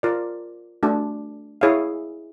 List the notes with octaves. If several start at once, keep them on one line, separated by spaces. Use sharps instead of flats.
F4 A#4 D5
A3 D4 F#4
E4 G#4 C#5 F5